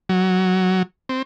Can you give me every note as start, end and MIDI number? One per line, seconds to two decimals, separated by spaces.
0.09 0.83 54
1.09 1.22 60